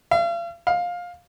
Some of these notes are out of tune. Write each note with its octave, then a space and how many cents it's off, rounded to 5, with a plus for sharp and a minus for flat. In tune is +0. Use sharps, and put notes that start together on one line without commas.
F5 -40
F5 +15